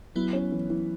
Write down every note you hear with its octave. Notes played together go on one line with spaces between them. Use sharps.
F#3 B3 E4
C#4
E3
E3